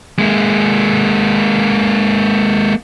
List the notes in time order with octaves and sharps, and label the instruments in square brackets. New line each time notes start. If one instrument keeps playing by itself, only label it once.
[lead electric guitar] G#3 A#3